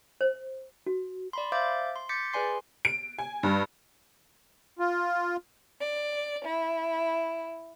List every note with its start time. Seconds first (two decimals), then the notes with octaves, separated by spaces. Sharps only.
0.21 C5
0.86 F#4
1.33 D5 B5 C6
1.52 C5 E5 F5 D6 G6 A6
1.96 C6
2.09 D6 G6 A6 B6 C#7
2.33 G#4 B4 D5 G#5 C6 C7
2.85 D7
3.19 G#5
3.43 G2
4.79 F4
5.80 D5
6.44 E4